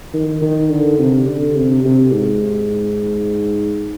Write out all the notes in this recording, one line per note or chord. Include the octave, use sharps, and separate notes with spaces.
D#3
D#3
D3
C3
D3
C3
C3
G#2